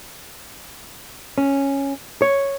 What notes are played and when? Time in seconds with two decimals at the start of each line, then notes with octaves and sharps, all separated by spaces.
1.38 C#4
2.22 C#5